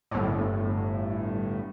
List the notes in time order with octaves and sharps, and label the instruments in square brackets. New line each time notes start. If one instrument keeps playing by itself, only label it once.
[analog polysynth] G1 A2